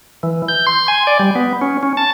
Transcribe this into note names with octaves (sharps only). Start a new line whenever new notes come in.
E3
G6
C6
G#5
D5
G3
B3
C#4
C#4
A5